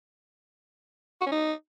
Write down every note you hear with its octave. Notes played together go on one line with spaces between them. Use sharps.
F#4
C#4
D#4